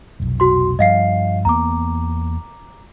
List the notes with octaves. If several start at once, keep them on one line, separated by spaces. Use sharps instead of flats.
F1 B1
F#4 C6
G2 F3 D#5 F5 C7
E2 A#3 B3 A#5 D6